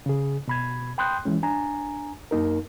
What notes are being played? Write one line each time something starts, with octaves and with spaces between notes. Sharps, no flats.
C#3 G#4
B2 B5 G#6
G5 B5 C6 D#6 F#6 G6
E3 F3 G#3 C#4
D4 G#5 A#5
F#2 A#3 D#4 A#4